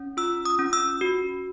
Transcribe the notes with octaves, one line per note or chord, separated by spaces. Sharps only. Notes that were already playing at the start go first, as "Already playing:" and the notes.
Already playing: C#4
F4 E6
D#6
C#4
E6
F#4